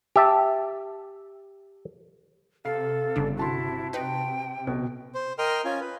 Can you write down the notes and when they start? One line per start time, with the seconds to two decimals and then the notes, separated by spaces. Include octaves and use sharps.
0.16 G4 E5 A5
2.65 C3 A4 F5 C7
3.16 G1 C#3 D4
3.37 E4 F#4 A5 C6
3.93 D#4 B4 G5
4.67 B1 B2
5.15 C5
5.38 A#4 D#5 G5 C6 F6
5.65 C#4 F4 G#5
5.81 B4